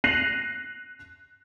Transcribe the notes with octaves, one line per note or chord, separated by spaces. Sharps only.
F#6 A#6 C7 D#7 F7 F#7